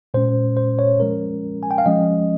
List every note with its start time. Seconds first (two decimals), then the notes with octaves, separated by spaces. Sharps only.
0.14 A#2 G#3 C#4 C5
0.57 C5
0.79 C#5
1.00 F3 G#3 C#4 A#4
1.63 G#5
1.71 G5
1.78 F5
1.86 F3 G#3 C#4 D#5